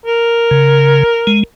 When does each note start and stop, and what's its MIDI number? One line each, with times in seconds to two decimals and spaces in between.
0.06 1.43 70
0.51 1.03 49
1.27 1.43 56